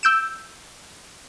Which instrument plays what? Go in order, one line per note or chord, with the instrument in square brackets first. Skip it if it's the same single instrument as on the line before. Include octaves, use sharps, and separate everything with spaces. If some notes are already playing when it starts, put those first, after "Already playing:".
[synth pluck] E6 G6 D7 E7